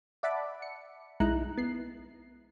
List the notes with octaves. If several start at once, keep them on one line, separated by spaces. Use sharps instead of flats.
D5 E5 F#5 A5 B5 D6
C#7
B1 G#3 D#4 E4 A#5 F#6
B3 C7